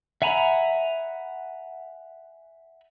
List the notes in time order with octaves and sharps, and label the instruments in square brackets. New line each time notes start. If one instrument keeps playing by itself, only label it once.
[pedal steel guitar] E5 F#5 G#5 A#5 B5